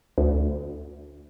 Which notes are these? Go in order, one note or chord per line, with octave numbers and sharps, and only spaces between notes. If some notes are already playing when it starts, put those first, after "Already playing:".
D2